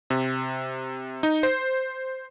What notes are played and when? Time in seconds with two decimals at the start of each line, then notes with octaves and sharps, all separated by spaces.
0.10 C3
1.23 D#4
1.43 C5